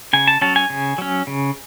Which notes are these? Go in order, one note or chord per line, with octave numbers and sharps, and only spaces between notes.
C#3 G#5
A5
F#3 C#4 A5
G#5
C#3
F#3 C#4
C#3